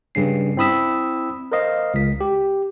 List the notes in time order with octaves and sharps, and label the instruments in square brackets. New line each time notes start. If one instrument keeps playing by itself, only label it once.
[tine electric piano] G2 C#3 C#4 C7
C4 E4 B5 D#6 E6 B6
A#4 C5 D#5 F5
C#2 B6
G4